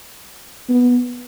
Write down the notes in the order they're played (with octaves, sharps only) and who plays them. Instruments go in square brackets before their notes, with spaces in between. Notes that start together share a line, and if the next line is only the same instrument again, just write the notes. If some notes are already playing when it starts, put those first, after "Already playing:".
[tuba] B3